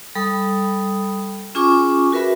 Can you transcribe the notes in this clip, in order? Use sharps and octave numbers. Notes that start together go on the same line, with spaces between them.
G3 A4 B5 D#6
C#4 F4 G#4 G#5 C#6 D6
F#4 A#4 B4 E5 B5